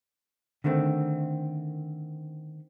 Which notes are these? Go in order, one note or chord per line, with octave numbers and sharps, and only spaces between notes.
D3 D#3 A3 C4